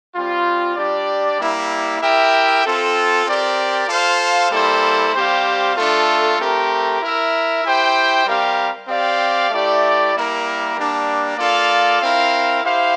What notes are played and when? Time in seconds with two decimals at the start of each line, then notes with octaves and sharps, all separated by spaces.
0.15 G3 C4 F4
0.76 G3 D4 G4 D5
1.38 G3 A#3 E4
2.01 E4 G4 A#4 E5 G5
2.64 C4 F4 A4
3.26 C4 G4 A#4 D5
3.89 F4 A4 C5 F5
4.51 G3 A#3 E4 A4 C5
5.14 G3 C4 G4 C5 F5
5.77 A3 D4 F4 A4
6.38 A3 C4 G4 A#4
7.00 E4 A#4 E5
7.64 E4 G4 C5 G5
8.26 G3 C4 G4 A#4 F5
8.88 C4 G4 D5 F5
9.51 A3 E4 G4 D5
10.14 G3 A#3 E4 A#4
10.76 G3 A#3 D4
11.38 A#3 F4 A4 D5 F5
12.01 C4 E4 A#4 F5
12.63 E4 G4 C5 F5